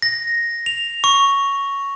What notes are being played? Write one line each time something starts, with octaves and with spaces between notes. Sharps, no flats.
A#6
F7
C#6